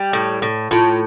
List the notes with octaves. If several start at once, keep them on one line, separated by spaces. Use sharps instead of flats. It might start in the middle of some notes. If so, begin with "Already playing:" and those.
Already playing: G3
A2
A2
A2 F4